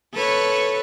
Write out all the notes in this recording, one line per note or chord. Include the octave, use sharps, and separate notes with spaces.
A4 B4 C#5